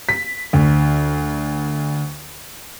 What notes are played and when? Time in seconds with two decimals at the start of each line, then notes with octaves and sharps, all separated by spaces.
0.09 B6
0.53 D2